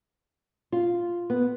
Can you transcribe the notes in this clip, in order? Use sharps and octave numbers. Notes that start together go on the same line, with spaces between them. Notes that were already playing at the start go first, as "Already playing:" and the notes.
F4
B3